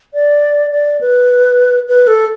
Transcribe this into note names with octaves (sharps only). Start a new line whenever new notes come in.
D5
D5
B4
B4
A4